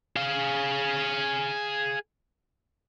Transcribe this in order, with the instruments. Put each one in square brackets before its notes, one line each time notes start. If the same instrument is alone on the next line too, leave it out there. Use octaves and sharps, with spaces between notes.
[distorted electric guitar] G#4 F5